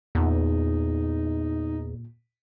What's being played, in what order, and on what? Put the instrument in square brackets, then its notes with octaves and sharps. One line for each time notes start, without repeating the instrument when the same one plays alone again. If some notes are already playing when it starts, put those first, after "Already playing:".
[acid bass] E2 [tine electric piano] A#2 [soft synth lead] D#4